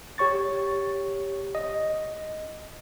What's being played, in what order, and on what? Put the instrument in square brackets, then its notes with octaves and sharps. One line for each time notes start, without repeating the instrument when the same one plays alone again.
[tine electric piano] G4 C#5 C#6 A6
D#5